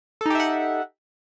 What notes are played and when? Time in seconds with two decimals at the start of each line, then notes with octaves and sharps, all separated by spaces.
0.21 A4
0.26 D#4
0.30 G4
0.35 E5
0.40 F#5